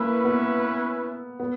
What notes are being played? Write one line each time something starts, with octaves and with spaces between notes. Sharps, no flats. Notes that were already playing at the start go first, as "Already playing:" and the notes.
Already playing: A#3 C#4 E4 B4 E5
B3
B3